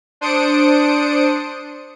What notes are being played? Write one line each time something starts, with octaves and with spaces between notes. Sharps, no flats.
D4 C5 D#6 C#7 D7